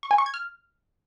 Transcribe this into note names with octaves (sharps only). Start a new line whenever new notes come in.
C#6
G#5
C#6
G#6
F6